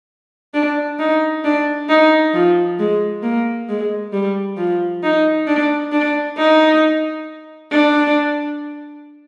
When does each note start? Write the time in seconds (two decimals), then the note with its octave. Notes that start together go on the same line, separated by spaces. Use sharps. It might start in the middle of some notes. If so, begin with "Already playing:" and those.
0.54 D4
0.99 D#4
1.44 D4
1.89 D#4
2.34 F3
2.79 G#3
3.23 A#3
3.69 G#3
4.13 G3
4.57 F3
5.03 D#4
5.47 D4
5.92 D4
6.37 D#4
7.72 D4